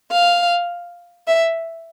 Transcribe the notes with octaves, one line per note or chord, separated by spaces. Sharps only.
F5
E5